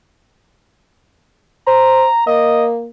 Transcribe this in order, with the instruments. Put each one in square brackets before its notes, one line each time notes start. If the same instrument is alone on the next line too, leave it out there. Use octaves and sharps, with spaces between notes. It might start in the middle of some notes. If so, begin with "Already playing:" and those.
[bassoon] C5 [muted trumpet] A#5
[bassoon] A#3 [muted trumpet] D#5